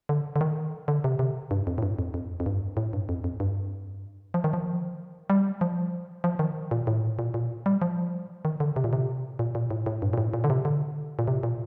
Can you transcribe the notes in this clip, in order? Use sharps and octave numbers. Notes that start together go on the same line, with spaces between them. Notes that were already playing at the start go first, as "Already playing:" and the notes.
D3
D3
D#3
D3
C3
C3
G2
F2
A2
G2
F2
F2
F2
G2
A2
G2
F2
F2
G2
F3
D#3
F3
G3
F3
F3
D#3
A#2
A2
A#2
A#2
G3
F3
D#3
D3
C3
A#2
C3
A#2
A#2
A2
A2
G2
A#2
A2
A#2
D3
C3
D3
A#2
C3
A#2